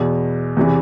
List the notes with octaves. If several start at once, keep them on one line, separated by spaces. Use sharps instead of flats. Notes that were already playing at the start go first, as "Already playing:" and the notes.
Already playing: E2 B2
E2 C3 E3